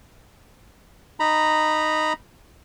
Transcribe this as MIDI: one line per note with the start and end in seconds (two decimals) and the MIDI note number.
1.20 2.13 63
1.20 2.13 82
1.20 2.13 83